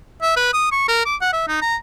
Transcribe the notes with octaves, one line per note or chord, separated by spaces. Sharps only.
E5
B4
D#6
C#6
A#4
D6
F#5
E5
D#4
A#5